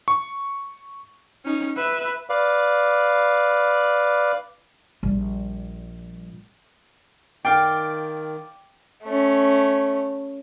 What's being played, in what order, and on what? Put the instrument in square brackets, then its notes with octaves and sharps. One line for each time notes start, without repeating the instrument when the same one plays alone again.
[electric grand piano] C#6
[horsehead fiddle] C#4 D#4
B4 E5
[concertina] B4 D5 F5
[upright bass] A#1 G3
[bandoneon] D#3 [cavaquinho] D5 F5 [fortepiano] G5
[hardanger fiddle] A3 C#4